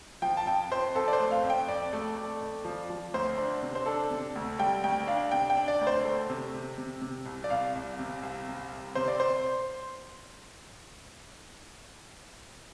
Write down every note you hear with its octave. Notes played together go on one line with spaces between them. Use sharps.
F3 G5
A5
F2 G5
F2 C5
F2 A4
D5
C5
A3
F5
F2
G5
F2 D5
A3
A3
F2
F3
F3
D2 C5
D4
C3
C5
D4 A4
C3
D2
G3 G5
D2 G5
D4 F5
C3 G5
G5
D4
D5
D2
C5
A3
C3
C3
C3
C3
C2
D5
C2 F5
C2
C3
C2
C3
C2
C3 C5
D5
C5